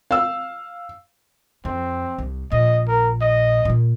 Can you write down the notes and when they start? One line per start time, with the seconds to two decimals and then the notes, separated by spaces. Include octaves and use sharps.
0.11 F5 E6
1.65 F2 C4
2.19 C2
2.52 A#1 A#2 D#5
2.88 A#4
3.21 D#5
3.65 A#2 A#3